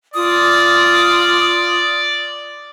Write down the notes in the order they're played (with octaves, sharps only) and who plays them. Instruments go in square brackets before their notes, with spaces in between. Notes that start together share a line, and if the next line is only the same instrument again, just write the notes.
[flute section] F4 D#6 [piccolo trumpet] D5